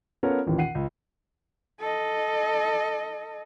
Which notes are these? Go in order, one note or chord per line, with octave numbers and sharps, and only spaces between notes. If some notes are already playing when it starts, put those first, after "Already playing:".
B3 C#4 F4 A4 A#4 C#5
A1 D#2 A#2 E3 C#4
F#5 C7 D#7
C#2
A4 D#5